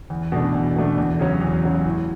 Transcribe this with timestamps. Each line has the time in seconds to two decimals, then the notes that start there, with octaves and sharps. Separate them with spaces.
0.10 E2
0.32 B2 A3 D4
0.55 E2
0.76 B2 A3 D4
0.98 E2
1.20 C#3 F#3 C#4
1.41 E2
1.63 C#3 F#3 C#4
1.85 A2